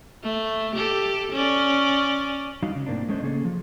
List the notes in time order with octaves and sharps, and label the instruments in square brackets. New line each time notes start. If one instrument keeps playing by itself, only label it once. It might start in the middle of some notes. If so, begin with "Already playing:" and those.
[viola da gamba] A3
G4 A4
C#4 D5
[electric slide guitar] F#3 G3 D#4 F#4 F5
C#3
A2 A#3 C4 D4
G#3 A3 C#4 D4 C5 D#5
C#3 A#3 C#4 G#4 A4
F3